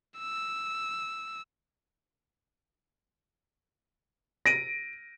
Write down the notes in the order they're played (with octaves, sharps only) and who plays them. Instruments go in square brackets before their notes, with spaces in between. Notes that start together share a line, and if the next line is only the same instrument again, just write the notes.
[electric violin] E6
[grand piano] A#6 D7 D#7